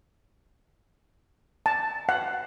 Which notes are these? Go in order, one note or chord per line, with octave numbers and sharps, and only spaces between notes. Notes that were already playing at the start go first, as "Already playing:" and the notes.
A5
F#5